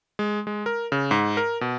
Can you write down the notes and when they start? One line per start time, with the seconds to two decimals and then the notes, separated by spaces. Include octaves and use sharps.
0.19 G#3
0.47 G#3
0.66 A#4
0.92 C#3
1.11 G#2
1.37 A#4
1.61 B2